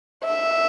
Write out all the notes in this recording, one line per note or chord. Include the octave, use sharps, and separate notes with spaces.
E5